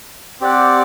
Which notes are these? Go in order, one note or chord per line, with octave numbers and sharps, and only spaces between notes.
C4 G4 D5 F#5